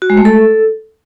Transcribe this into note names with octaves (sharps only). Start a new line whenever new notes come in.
F#4
G#3
A3
A4